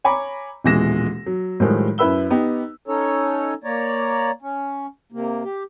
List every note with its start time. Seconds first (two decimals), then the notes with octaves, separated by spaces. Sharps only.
0.04 C#5 G#5 A#5 B5 D6
0.64 D#1 B2 E3 G#3 A#6 E7
1.26 F#3
1.60 A2 D#3 F3 G3 G#3
1.98 F#2 E4 B4 B5 E6 G7
2.30 B3 D#4 G4
2.88 C#4 D#4 A4 C#5
3.64 A#3 C#5 D5 A#5
4.42 C#4
5.12 C3 A#3
5.43 G4